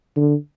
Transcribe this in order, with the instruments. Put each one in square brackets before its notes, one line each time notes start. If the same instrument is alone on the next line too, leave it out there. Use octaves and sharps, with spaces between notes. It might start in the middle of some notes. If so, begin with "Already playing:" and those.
[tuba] D3